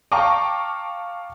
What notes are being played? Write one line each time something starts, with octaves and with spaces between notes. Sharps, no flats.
F5 G5 A5 A#5 C#6 D6